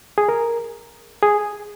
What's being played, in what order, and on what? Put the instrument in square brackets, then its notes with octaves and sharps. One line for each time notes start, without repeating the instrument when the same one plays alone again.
[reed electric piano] G#4
A#4
G#4